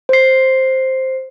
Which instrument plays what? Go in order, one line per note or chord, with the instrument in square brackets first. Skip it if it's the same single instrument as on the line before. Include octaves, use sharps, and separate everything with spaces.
[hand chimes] C5 C7